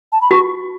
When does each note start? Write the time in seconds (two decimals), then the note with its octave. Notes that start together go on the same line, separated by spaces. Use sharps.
0.12 A5
0.21 B5
0.31 F#4 C#6